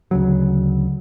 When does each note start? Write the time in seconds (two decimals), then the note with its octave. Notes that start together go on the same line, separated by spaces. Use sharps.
0.11 D2 C#3 F#3